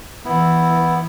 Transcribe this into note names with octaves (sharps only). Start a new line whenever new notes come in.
E3 B3 E4